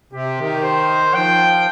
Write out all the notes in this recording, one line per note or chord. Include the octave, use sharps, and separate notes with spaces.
C3 G4
D#3
C5
F3 G5